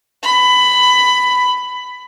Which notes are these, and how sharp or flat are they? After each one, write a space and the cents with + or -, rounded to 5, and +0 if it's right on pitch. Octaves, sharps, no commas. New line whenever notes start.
B5 +15